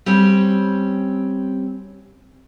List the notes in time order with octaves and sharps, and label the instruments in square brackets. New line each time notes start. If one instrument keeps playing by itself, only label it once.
[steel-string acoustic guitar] G3 C4 C#4